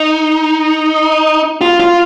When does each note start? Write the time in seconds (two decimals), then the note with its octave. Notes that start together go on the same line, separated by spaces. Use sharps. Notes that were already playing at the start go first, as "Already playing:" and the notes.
Already playing: D#4
1.61 F4
1.80 F4